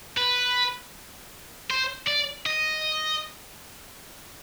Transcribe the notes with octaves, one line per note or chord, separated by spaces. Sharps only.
B4
C5
D5
D#5